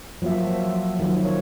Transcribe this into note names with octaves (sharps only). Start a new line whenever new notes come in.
F3 F#3 A#3 F#4 E5
D#3 F3 F#3
C#5